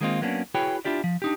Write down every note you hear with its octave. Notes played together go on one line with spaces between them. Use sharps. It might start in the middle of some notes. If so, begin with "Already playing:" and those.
D#3 G#3 A#3 C4 D#4 F4
F#3 A#3 B3 C#4 D4
E4 F#4 G#4 B4 C#5 G5
D4 E4 F4 G4 D5
F3
D4 D#4 G4